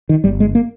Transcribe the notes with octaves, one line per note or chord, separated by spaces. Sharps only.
D#3
G1 G3
G#3
A#3